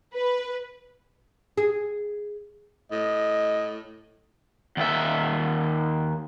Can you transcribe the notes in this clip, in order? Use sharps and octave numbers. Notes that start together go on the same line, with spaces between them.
B4
G#4
A2 D#5
D#2 E5